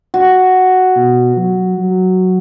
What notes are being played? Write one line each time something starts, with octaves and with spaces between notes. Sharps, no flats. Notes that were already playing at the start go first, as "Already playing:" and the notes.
F#4
B2
F#3
F#3